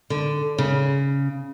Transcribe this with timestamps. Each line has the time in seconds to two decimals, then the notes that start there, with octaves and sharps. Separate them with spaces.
0.10 D3
0.58 C#3